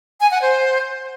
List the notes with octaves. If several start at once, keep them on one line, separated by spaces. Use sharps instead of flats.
G#5
F#5
C5